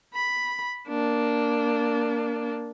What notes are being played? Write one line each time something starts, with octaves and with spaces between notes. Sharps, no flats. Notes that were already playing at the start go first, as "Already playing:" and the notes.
B5
A#3 D4